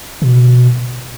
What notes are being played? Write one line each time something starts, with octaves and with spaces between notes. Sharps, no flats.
B2